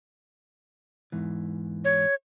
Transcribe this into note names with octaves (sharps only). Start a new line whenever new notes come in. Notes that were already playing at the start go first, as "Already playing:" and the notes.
E2 G#2 E3
C#5